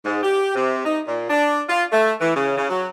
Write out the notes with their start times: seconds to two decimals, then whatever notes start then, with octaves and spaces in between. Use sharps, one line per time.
0.05 G#2
0.23 G4
0.55 C3
0.85 D#4
1.07 A#2
1.30 D4
1.69 F4
1.92 A3
2.21 E3
2.36 C#3
2.58 C#3
2.70 F#3